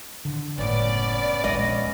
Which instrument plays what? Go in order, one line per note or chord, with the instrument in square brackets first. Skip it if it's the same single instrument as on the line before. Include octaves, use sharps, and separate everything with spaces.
[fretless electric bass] D3
[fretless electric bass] F#1 A2 [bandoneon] B3 C#4 [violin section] D5
[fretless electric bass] D#1 A#1 G#3 [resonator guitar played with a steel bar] D#5